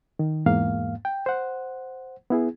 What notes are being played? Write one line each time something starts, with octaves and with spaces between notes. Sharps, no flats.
D#3
E2 G#2 A#3 F5
G5
C5 F#5
B3 E4 G#4